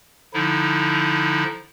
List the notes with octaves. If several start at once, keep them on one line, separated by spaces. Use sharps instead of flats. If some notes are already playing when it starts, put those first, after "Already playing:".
D3 F3 D#4 E4